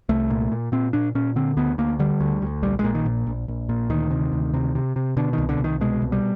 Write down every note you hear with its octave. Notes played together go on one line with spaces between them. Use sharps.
C2 A3
A#2
A#2
A#2 C4
A#2 D4
A#2 C#4
D3 C4
D2 B3
D2 A#3
D3 G3
D2
D2
A#1 G3
A#2 G#3
D#3
A#1
A#1
A#1
A#2
D2 D#3
C3
D2
C3
C3
C3
B2 D3
C2 D#3
D3
C2
D#3
B2 G#3
C2
G3